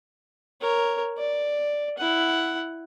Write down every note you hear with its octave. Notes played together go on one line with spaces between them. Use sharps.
A#4 C#5
D5
E4 F#5